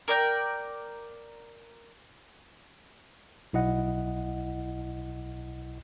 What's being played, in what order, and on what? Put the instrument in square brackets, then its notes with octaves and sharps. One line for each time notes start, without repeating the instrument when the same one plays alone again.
[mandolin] A#4 D5 G5
[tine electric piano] B1 E4 D#5 F#5